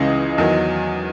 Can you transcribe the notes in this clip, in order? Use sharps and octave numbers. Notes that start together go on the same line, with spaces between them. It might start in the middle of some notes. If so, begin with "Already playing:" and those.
Already playing: C#2 C#3 E3 D#5
E2 D#3 F#3